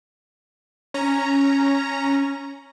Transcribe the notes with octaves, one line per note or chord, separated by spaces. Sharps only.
C#4 A#5